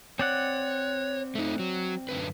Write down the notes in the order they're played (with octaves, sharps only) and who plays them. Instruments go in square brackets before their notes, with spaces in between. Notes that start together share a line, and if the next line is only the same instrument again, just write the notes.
[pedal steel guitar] C4 D5 F#5 [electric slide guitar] C#5
[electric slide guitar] A3 D#4
F#3
F#2 D3 B4